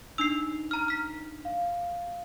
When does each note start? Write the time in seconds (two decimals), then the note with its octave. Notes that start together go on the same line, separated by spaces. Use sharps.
0.18 D4 D#4 E6 C7 F7
0.71 A#5 F6
0.88 F6 B6
1.45 F5